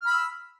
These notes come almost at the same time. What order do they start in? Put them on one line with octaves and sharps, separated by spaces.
F6 B5 E6